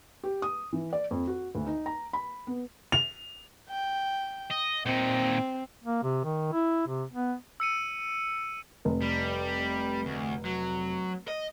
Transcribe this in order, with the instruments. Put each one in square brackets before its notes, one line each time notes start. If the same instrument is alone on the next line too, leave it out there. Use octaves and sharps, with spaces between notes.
[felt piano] G4
D#6
E3
D5
F2
F#4
D2
D#4
A#5
B5
B3
[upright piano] F7
[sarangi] G5
[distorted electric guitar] D#5
[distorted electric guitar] A#2 D#4 [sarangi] C4
[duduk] A#3
C3
D#3
E4
C3
B3
[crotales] E6 C#7 D#7
[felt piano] F1
[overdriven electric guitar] G3
D2
F#3
D#5